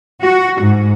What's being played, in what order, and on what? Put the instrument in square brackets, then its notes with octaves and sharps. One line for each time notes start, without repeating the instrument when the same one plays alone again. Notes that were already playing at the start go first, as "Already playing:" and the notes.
[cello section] F#4
G#2